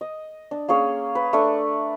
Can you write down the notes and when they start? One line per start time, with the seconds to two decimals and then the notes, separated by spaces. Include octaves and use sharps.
0.01 D#5
0.51 D4
0.69 A#3 C#4 G#4 C#5
1.15 B4
1.33 A3 D4